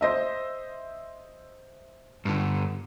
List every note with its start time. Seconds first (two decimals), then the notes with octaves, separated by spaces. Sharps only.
0.01 C5 D#5 E5
2.25 G2 D3